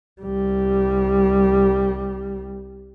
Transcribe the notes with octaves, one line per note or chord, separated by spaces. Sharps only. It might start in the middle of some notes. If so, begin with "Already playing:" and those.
C2 G3